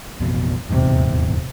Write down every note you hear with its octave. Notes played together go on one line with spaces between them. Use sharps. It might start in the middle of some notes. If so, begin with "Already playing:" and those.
A1 F2 B2
D#1 E2 G#2 C3